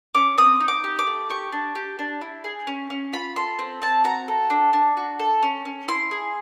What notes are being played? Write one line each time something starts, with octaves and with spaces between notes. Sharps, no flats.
C#4 D6
C4 D#6
D#4
D6
G4
D6
A3
G4 C#6
D4
G4
D4
E4
G#4
C#4
C#4
F4 B5
A4 C6
C4
C4 A5
F#4 A#5
A4
D4
D4
F#4
A4
C#4
C#4
E4 C6
G#4